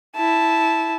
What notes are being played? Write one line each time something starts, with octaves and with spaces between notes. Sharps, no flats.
E4 A5